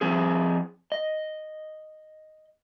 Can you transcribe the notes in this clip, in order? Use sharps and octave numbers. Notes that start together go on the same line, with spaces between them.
F3 C4 G#4
D#5